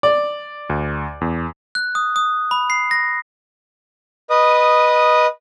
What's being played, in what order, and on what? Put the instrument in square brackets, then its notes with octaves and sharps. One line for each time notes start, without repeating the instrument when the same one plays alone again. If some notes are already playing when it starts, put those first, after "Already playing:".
[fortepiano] D5
[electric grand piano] D2
E2
[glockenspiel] F#6
D#6
D#6
B5
C7
A#6
[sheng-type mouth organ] B4 D#5 D#6